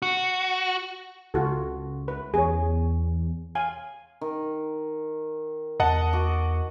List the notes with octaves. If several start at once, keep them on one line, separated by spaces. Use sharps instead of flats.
F#4
C#2 F4 F#4 A4
B4
E2 G#4 C#5
F5 G#5
D#3
E2 D#5 F#5 A5
F#4 D6